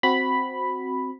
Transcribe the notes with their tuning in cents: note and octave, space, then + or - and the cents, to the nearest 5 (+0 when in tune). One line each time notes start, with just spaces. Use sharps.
C4 +0 F#4 -5 B5 +0